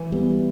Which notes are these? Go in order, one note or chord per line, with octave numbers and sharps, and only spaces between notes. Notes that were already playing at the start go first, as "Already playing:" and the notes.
Already playing: E3
G3 B3